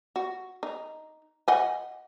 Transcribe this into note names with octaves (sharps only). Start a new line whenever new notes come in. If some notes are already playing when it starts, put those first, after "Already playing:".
F#4
D#4
D#5 F#5 G#5